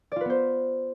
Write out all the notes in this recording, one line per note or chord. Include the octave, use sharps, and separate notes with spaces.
B3 F4 B4 C5 D5